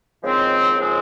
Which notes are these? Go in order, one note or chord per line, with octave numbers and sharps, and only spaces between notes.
D#2 C#3 F3 G#3 C4
D#2 C#3 F3 G#3 C4